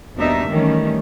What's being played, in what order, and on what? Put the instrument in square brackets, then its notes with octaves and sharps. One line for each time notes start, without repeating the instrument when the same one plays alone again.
[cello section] D#2 B2 G3 D4 D#4 E5
D#3 E3 G3 A3 C#4